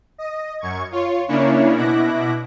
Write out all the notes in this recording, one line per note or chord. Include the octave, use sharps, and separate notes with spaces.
D#5
F#2 C#6 G#6
F4 C#5
C#3 A#3 C#4 D4 E4 C#5
B2 E4 D6 F#6 A#6